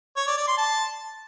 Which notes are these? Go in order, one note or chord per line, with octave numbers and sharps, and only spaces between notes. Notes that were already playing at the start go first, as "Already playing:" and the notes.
C#5
D5
D5
C6
A5